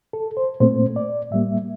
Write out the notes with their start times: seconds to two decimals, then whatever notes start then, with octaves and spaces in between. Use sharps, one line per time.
0.13 A4
0.37 C5
0.60 A#2 A3 C4 C5
0.96 D5
1.31 A2 G3 A#3 E5